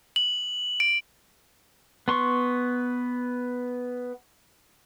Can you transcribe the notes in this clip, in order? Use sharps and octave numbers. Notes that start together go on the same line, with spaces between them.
F#7
D7
B3 C6 C#6